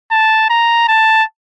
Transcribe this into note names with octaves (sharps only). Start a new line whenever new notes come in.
A5
A#5
A5